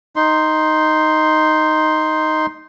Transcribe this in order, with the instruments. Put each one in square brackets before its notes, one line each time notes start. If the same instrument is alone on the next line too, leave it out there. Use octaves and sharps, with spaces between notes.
[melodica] D#4 C6